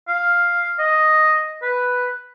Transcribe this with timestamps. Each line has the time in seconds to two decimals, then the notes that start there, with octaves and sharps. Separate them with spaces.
0.08 F5
0.79 D#5
1.62 B4